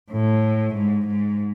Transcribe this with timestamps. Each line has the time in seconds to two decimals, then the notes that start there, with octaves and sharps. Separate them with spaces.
0.11 A2
0.75 G#2
1.07 G#2